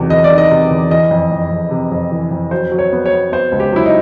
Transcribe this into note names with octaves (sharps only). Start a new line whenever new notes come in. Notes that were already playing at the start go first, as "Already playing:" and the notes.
Already playing: E2 C3 D#3 F#3
E2 D#5
D5
D#3
D#5
C3
E2
E3 D#5
F2
F2
F2
C3
F2
E3
F2
F#3 C5
F#3
C#5
B3
C#5
B3
B3 C5
C#2
G4
F#3 E4
D#4